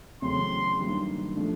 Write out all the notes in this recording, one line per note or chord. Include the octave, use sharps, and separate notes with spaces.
E2 C#3 F#3 A3 C4 C6
G2 D#3 F#3 A#3
A#2 F3 A3 D4